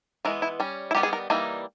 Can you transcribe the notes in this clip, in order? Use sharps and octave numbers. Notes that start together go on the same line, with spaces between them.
E3 G#3 B3 A#4
E4
G3 C#4
E4
D#3 G3 B3 D#4 G4
G#4
A#4
E3 G3 A#3 D#4